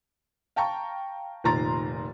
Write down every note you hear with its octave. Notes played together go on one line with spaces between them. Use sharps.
F5 G5 A5 A#5 C#6
F1 A#2 D#3 A#5 C6 A6